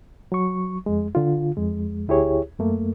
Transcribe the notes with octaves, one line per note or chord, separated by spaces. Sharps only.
F#3 C#6
F2 G#3
D3 F4
F2 G#3
D2 E4 G4 G#4 C#5
F#2 A3 A#3